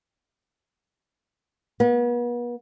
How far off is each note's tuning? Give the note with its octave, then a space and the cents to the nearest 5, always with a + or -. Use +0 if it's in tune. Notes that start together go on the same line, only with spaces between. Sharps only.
B3 -40